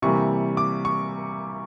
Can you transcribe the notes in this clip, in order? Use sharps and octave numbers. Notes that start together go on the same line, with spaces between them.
C3 E3 G3 A#3 C#6
D6
C#6